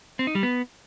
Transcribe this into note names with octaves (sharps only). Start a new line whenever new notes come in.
C4
D#4
G3
B3